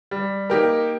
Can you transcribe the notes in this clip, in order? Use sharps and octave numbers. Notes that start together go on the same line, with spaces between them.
G3
A#3 D#4 G4 A#4